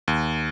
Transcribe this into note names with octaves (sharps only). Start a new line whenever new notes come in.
D#2